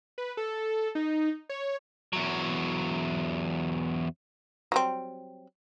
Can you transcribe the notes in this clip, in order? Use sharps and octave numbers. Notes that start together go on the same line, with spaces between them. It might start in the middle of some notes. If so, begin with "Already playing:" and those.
B4
A4
D#4
C#5
E2 F#3
F#3 G3 C4